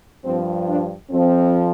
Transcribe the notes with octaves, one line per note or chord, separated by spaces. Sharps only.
G2 F3 C4
D4
F2 F3 C4